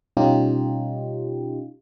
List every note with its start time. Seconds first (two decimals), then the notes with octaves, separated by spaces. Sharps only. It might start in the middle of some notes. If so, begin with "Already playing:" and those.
0.17 B2 G3 C#4 D#4 F4 G4